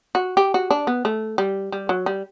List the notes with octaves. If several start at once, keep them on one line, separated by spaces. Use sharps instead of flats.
F#4
G4
F#4
D4
B3
A3
G3
G3
F#3
G3